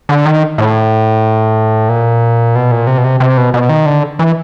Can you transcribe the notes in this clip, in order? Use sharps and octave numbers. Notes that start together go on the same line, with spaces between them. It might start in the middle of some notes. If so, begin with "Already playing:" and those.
D3
D#3
A2
A#2
B2
A#2
C3
B2
C3
C3
B2
B2
D#3
D3
E3